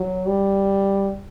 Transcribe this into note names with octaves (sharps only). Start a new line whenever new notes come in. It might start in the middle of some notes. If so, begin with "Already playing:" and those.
Already playing: F#3
G3